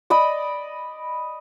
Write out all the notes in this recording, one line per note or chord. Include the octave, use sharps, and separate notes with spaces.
D5 D#5 B5